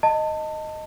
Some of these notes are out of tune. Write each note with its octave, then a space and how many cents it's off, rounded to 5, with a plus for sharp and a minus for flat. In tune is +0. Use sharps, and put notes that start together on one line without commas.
D#5 +0 A5 +25